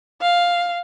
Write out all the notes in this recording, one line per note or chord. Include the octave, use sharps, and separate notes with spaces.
F5